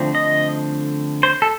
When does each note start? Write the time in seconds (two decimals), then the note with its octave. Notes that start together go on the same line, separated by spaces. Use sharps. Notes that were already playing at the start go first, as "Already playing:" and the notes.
Already playing: D3 F3 A3 C4
0.15 D#5
1.23 C5
1.42 A4